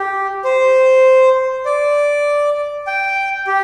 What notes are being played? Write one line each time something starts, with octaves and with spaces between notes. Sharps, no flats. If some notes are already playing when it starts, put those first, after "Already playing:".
Already playing: G4
C5
D5
G5
G4